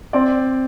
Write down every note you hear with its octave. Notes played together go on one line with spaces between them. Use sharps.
C4 D5